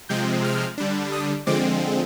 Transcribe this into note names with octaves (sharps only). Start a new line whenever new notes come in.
C3 F3 G#3 C4 G6
F6
D3 G3 D4
D#6
D3 F3 G#3 C4 D6